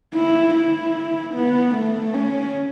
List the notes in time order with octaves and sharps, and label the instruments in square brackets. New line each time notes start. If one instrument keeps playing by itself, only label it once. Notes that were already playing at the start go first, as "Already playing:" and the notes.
[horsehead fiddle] E4
E4
B3
A3
C#4